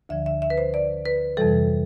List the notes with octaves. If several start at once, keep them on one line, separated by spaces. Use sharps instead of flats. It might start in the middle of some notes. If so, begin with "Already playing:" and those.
D2 D3 F3 E5
E5
E5
B4
C5
D5
B4
F2 C3 E3 G3 A4